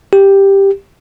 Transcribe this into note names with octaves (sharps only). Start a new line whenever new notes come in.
G4